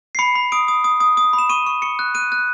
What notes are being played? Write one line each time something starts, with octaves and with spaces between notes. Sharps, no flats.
C7
B5 C#7
B5
D#6 D7
D#6
D#6
D#6
D#6
B5
E7
C#6 D#7
C#6
C#6 C#7
F#6
F#6 D#7
F#6